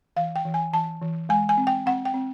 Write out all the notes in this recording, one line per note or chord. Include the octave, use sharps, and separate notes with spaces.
E3 F5
G5
E3
G#5
E3 A5
E3
G#3 G#5
G#5
C4
G5
C4 F#5
G5
C4